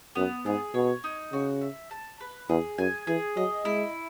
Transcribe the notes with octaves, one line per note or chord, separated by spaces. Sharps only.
F#2 B3
G#2 G#4
B2 C#5
D#4
C#3 F#4
E5
A5
B4
E2 G#4
F#2 G#5
E3 G#4
F#3 D#5
G#3 E4